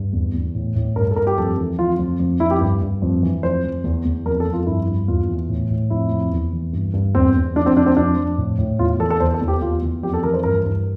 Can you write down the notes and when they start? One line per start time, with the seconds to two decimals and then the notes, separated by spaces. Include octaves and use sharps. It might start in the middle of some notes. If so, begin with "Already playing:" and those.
Already playing: G2
0.13 E2
0.34 E2
0.55 A2
0.76 A2
0.96 G2 A#4
1.11 A4
1.16 G2 A#4
1.27 G4
1.37 F2 A4
1.58 E3
1.78 F2 F4
1.99 F2
2.19 F2
2.40 F2 E4
2.51 G4
2.61 G2
2.82 G2
3.02 F2
3.23 E3
3.43 F2 C5
3.64 F2
3.84 E2
4.05 E2
4.26 F2 A#4
4.40 A4
4.46 F2
4.53 F4
4.67 G2 E4
4.87 G2
5.08 E2 F4
5.28 E3
5.49 A2
5.70 A2
5.90 F2 E4
6.11 F2
6.32 E2
6.53 E3
6.73 G2
6.93 G2
7.15 E2 C4
7.35 E2
7.55 F2 D4
7.66 C4
7.76 F2 D4
7.86 C4
7.97 F2 D4
8.17 F2
8.38 A2
8.59 A2
8.79 E2 F4
9.00 E3 A4
9.10 A4
9.20 E2 C5
9.34 A4
9.41 E2
9.48 G4
9.61 E2 F4
9.82 E2
10.03 F2 G4
10.14 A4
10.23 E3 A#4
10.34 C5
10.44 G2 A#4
10.65 G2